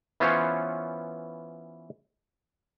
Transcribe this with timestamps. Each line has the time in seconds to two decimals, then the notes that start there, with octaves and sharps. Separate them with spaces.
0.20 E3 B3 C#4 F4 C5 C#5